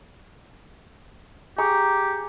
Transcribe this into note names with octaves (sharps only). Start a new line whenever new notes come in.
G4 G#4 A#5 C#6